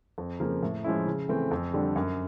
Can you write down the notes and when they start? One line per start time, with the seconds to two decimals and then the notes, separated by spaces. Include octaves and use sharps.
0.18 F2
0.40 C#3 F3 A#3
0.63 A2
0.84 F3 G#3 C#4 E4
1.07 C#3
1.29 E3 A3 C4
1.51 F2
1.74 D3 G3
1.96 F#2